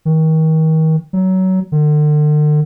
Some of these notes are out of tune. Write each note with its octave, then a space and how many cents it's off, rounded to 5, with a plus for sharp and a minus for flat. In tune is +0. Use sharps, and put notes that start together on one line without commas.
D#3 +35
F#3 +20
D3 +40